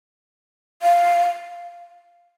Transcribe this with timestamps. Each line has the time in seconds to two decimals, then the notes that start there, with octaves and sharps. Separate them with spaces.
0.82 F5